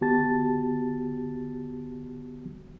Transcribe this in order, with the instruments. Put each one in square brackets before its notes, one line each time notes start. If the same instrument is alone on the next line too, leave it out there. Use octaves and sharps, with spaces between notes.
[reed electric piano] D3 B3 F#4 G4 A5 A6